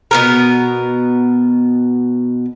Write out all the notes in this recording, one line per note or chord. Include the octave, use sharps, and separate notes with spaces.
B2 B3 A#4